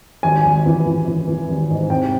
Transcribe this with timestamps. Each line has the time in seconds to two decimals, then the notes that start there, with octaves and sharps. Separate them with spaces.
0.23 G#1 G#5
0.44 G#1
0.66 E3
0.86 E3
1.07 E3
1.28 E3
1.49 G#1
1.70 G#2
1.90 C3 G5